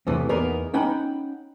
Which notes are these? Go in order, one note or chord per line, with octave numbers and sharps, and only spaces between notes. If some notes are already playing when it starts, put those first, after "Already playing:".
E2 A2 C3 E3
E2 A#3 B3 D#4 A#4
C#4 D#4 F#5 G5 B5